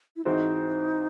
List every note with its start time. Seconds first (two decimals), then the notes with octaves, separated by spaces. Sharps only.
0.16 E4
0.25 G#2 E3 C4 D#4 F#4 C5